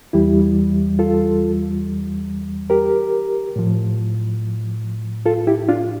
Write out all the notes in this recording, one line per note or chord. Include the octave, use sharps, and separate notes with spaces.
E2 E3 G3 E4 G4
F4 A4
G4 A#4
A2 F3
F4 A4
E4 G4
D4 F4